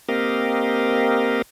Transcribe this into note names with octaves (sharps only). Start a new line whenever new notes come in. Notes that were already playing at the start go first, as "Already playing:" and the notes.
A#3 C4 G4 A#4 D#5 F5